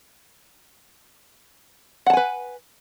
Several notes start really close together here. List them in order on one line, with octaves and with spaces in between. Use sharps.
F#5 A5 G#5 B4